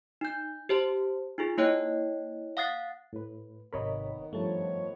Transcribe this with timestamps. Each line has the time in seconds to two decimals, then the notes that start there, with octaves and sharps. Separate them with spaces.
0.21 D#4 G6
0.69 G4 C5 A5
1.38 D#4 F4 G#4
1.58 A#3 E4 C#5 D#5 G5 F#6
2.57 F5 F#5 D#6 F#6 A6 C7
3.13 A2 B4
3.73 G#1 C3 D#3 B3 A#4 C#5 D#5 B5
4.33 G2 F3 A3 C#5 A5